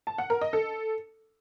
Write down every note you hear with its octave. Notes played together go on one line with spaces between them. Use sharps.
A5
F#5
A#4
D#5
A4